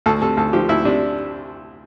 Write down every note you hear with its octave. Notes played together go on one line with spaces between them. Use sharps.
D2 A4
C3 A4
D2 A4
F3 G4
D2 E4
C3 D4